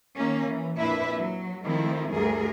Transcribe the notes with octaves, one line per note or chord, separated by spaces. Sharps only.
D#3 A#3 C#4
E3
F2 A#2 D4 E4 B4 E5
F#3
D#3 F3 A3 C4 E4
D2 G2 G#4 A#4